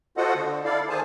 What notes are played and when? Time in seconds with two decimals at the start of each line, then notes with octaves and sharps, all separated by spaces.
0.17 F4 F#4 A4 C5 D#5 F#5
0.35 D3
0.65 E4 A4 D5 F5
0.89 D#3 G#4 C5 G#5 A5